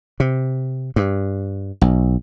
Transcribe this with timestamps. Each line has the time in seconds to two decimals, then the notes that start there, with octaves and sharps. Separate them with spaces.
0.20 C3
0.96 G2
1.81 B1